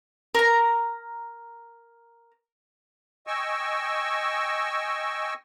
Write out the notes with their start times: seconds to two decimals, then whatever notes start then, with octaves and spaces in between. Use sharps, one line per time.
0.34 A#4 A#5
3.27 D#5 G5 G#5 C#6 E6